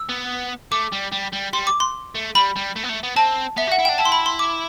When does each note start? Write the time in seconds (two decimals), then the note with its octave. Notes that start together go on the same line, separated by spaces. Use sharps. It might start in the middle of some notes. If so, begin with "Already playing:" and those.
Already playing: E6
0.09 B3
0.71 A3 D6
0.92 G3
1.12 G3
1.33 G3
1.53 G3 C6
1.67 D6
1.80 C6
2.15 A3
2.35 G3 B5
2.56 G3
2.76 A3
2.83 B3
2.89 A3
3.03 B3
3.16 C4 A5
3.57 B3 E5
3.68 F#4
3.72 F#5
3.79 E4
3.85 D4 G5
3.98 E4 A5
4.05 C6
4.12 B5
4.26 C6
4.39 D6